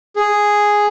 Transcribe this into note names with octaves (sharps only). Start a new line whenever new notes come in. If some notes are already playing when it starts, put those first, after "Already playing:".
G#4